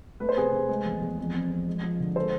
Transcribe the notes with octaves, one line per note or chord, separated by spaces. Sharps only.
A3 B4
C5
C3 G#4 B4
A3
G#3
E2
E2
F2
C4
F2
G#3
F3
D3
G#3 A4 C5